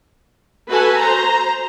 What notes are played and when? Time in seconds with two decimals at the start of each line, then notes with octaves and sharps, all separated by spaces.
0.69 F#4 A4 B4 G#5
0.99 C5 A#5